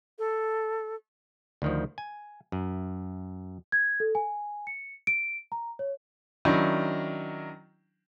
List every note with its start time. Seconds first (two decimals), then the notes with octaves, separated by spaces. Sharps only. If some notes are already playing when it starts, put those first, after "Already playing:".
0.19 A4
1.62 D2 D#3 F3
1.98 G#5
2.52 F#2
3.72 G#6
4.00 A4
4.15 G#5
4.67 C#7
5.07 D7
5.52 A#5
5.79 C#5
6.45 D#3 F#3 C#4 D4 E4